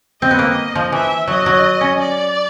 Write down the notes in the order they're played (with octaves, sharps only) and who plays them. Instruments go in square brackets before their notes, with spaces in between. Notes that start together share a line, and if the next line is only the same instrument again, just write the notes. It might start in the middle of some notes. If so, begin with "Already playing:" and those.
[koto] C4 [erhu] D#5
[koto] B3
A#3
F3
[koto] E3 [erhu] E5
[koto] F#3 [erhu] D#5
[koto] F#3
C#4
[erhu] D5